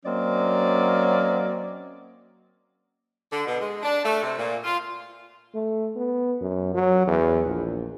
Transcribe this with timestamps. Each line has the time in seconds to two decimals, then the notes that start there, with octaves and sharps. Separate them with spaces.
0.04 F#3 A#3 C4 C#4 D5 D#5
3.31 D3
3.47 B2
3.60 G#3
3.83 D4
4.04 A3
4.23 C3
4.37 A#2
4.64 F4
5.55 A3
5.96 B3
6.41 F#2
6.75 F#3
7.07 E2
7.47 A#1